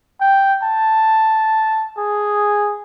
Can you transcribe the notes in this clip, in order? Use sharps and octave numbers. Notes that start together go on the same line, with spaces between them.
G5
A5
G#4